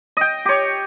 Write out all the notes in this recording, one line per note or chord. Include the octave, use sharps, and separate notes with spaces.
D#5 G5
G4 C#5